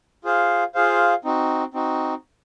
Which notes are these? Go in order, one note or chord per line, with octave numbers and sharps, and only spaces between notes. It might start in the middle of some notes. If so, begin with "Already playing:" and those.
F4 G#4 C5 F5
F4 G#4 C5 F5
C4 D#4 F#4
C4 D#4 F#4